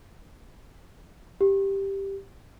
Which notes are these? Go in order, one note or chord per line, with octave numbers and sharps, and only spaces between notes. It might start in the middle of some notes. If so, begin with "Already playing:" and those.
G4